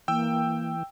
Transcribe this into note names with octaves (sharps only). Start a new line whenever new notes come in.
E3 A#3 G5 E6